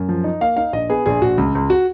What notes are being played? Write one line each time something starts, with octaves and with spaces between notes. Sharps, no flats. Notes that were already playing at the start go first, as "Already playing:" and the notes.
Already playing: F#2
F3
D#4
A#3 F5
D#4 F5
A#1 D#5
B3 G#4
A#1 G#4
A#1 F#4
C#2
C#2
F#4